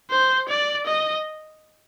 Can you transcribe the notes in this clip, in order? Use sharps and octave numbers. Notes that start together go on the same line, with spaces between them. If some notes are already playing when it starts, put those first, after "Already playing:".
C5
D5
D#5